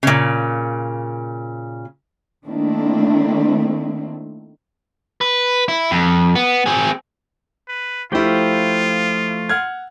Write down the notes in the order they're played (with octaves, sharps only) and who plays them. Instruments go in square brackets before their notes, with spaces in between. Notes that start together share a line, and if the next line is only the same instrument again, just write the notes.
[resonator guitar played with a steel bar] A#2 C#3
[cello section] D#3 A3 A#3 C4 D4 E4
[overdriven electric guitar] B4
E4
F2
B3
C4 G#4
[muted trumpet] B4
[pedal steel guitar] F3 A3 G5 [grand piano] E4 G4 [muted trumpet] F4
[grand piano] F#5 F6 G#6